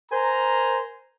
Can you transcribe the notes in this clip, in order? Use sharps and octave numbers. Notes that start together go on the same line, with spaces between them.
A#4 C5 G#5 A#5